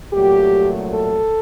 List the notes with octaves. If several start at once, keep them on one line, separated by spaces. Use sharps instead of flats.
C2 A#2 F#3 A3 G4
A4